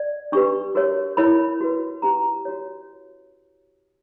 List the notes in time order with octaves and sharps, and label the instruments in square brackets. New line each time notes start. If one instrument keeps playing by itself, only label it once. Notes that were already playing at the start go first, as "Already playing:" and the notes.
Already playing: [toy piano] D5
D4 G4 B4 C#6
F#4 A#4 C#5
E4 A#4 C#5 B5
F#4 B4
C#4 G4 B4 A#5
F#4 C#5